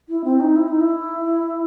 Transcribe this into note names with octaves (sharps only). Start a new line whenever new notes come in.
E4
C4
D#4
E4
D#4
E4